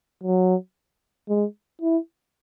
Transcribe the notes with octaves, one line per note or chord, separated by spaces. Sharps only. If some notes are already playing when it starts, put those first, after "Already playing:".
F#3
G#3
E4